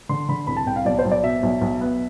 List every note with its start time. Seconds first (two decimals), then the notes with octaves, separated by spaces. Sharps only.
0.09 D3 C6
0.29 D3 B5
0.47 C2 B5
0.57 A5
0.66 C2 G5
0.76 F5
0.85 B1 D5
0.99 C5
1.05 B1
1.11 D5
1.23 B2 E5
1.43 B1
1.61 B1
1.81 B3